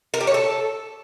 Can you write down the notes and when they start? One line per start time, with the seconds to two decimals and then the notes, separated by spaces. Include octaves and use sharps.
0.14 A#4
0.21 G4
0.27 C#5
0.34 A4